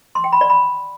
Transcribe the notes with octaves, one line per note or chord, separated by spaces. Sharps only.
C6
G5
B5
D5
B5